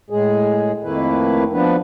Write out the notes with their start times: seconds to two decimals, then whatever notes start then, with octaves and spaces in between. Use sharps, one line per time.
0.10 A2 G#3 G#4
0.84 F2 D#3 A3 A#3 E4 B4
1.53 F3 B3 D4 B4